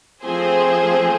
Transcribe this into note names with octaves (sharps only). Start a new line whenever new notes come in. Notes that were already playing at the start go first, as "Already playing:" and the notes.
F3 A3 C4 G#4 C5